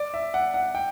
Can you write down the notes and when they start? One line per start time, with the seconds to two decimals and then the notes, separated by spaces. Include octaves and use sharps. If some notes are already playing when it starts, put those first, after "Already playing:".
Already playing: D5
0.14 E5
0.34 F#5
0.54 F#5
0.75 G5